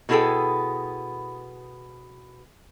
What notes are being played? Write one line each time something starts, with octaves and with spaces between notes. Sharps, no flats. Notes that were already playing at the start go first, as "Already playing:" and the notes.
B2 B3 E4 G#4 A4 G5